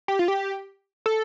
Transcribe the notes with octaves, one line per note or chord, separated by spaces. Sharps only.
G4
F4
G4
A4